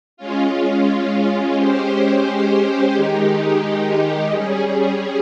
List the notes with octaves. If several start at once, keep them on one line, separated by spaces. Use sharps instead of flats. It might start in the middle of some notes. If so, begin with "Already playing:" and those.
G#3 C#4 F4
G#3 C#4 G4 C5
D#3 G#3 D#4 G4
G3 C#4 G#4